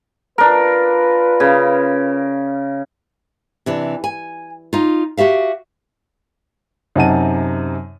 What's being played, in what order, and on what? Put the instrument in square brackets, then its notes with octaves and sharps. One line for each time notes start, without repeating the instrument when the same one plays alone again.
[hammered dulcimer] D4 A#4 [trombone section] F4 B4
[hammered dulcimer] C#3
[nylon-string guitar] C3 E3 D4
G#5
D#4 F4
F#4 G4 E5 F5
[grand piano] F#2 C3 D#4 F#5 A5 D#7